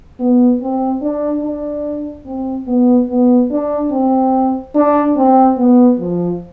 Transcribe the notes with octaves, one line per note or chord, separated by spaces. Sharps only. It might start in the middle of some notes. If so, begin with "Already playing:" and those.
B3
C4
D4
D4
C4
B3
B3
D4
C4
D4
C4
B3
F3